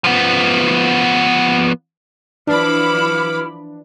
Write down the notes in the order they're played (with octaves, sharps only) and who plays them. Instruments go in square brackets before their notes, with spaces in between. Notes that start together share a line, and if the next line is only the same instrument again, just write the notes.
[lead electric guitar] F3 B3
[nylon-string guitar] E3 [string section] F3 B5 D6 [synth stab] D4 [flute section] E4 F#4 F6